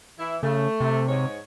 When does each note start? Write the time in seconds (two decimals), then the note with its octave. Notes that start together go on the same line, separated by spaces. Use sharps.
0.18 E3 E4
0.43 C#3 A3
0.81 C3
1.08 G#2 C#5